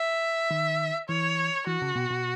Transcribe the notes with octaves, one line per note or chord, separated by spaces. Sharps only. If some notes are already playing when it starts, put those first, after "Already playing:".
Already playing: E5
D#3
E3 C#5
E3 F#4
C#3
B2
B2